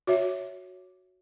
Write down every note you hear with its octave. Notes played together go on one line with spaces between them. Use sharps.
F#4 C#5 E5